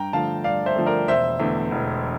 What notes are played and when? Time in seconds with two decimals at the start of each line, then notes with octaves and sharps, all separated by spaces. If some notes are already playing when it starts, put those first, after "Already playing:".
Already playing: G2 G5 A#5
0.13 D3 F3 A3 F5 A5
0.44 G2 D5 F5
0.66 C5 E5
0.76 D3 F3 A3
0.86 A#4 D5
1.08 E1 C5 E5
1.40 E2 D3 A3
1.71 E1